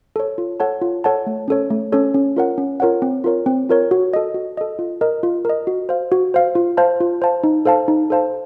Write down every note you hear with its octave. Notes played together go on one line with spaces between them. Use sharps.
A4 C#5
F4
A4 C#5 F#5 A5
F4
A4 C#5 F#5 A5
A3
C#4 A4 C#5
A3
C#4 A4 C#5
C#4
F4 A#4 C#5 F#5
C#4
F4 A#4 C#5 F#5
C4
F4 A#4 C#5
C4
F4 A#4 C#5
F#4
A4 D#5
F#4
A4 D#5
F4
A#4 D#5
F4
A#4 D#5
F#4
C5 F5
F#4
C5 F5
F4
C5 F5 A5
F4
C5 F5 A5
D#4
A4 C5 F5 A5
D#4
A4 C5 F5 A5